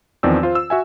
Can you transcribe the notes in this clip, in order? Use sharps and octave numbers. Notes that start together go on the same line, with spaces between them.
E2 D#3 F3 C4 D5 E6
F4 C5
E6
F#4 E5 G#5